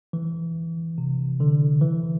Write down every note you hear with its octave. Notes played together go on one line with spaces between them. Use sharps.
E3
C3
D3
E3